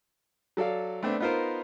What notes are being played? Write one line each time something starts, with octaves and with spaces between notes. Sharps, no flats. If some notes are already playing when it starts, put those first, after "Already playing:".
F#3 A4 D5 F5
A3 B3 C4 D4
B3 D#4 F4 A#4 C5